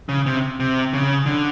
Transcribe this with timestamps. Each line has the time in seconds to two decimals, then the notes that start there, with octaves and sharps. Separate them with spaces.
0.09 C#3
0.26 C3
0.60 C3
0.93 C#3
1.26 D3